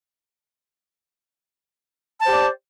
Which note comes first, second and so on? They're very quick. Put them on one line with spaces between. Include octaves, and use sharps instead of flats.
A5 C5 G4 D5